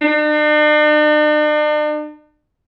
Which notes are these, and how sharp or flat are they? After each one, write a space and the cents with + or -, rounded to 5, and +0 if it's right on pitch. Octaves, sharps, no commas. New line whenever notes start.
D4 +45